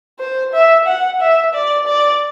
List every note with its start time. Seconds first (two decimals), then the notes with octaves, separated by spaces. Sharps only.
0.19 C5
0.53 E5
0.87 F#5
1.21 E5
1.54 D5
1.87 D5